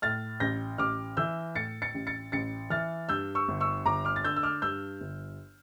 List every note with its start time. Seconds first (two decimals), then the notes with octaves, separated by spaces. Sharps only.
0.02 A2 F6 A6
0.40 A1 G6 A#6
0.78 A1 D6 F6
1.17 E3 E6 G6
1.55 A2 A6 C#7
1.82 A6 C#7
1.94 A1
2.07 A6 C#7
2.32 A1 A6 C#7
2.70 E3 F6 A6
3.09 G2 E6 G6
3.35 C#6 E6
3.48 G1
3.60 C#6 E6
3.85 G1 A#5 D6
4.05 D6 F6
4.16 A6
4.24 D3 E6 G6
4.36 E6
4.43 D6 F6
4.62 G2 E6 G6
5.00 G1